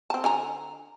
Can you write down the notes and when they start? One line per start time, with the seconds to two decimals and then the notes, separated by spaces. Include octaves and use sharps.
0.10 C4 A5
0.24 D3 G#5 A#5